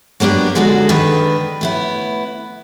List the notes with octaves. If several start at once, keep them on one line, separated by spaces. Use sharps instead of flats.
F#3 A#3 B3 D4 G4
D3 G#3 D#4 F#4 A4
D#3 D4 B4
A2 B3 E4